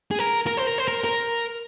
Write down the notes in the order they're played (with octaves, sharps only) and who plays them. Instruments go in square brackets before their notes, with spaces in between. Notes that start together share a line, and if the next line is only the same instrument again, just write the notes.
[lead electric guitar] G#4
A#4
A#4
C5
A#4
C5
A#4
A#4